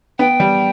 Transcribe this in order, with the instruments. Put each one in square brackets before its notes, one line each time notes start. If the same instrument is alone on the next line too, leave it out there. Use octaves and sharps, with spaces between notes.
[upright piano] B3 [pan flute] G5
[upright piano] G3